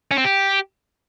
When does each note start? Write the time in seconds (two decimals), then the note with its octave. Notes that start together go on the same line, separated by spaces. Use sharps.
0.11 C#4
0.18 C4
0.24 G4